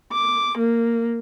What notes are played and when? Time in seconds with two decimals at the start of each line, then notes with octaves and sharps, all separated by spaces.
0.13 D6
0.58 A#3